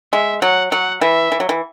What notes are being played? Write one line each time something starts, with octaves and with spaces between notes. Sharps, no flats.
G#3 E5
F#3 F#5
F#3 F#5
E3 E5
E3
F#3
E3